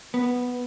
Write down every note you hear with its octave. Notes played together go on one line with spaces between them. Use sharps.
B3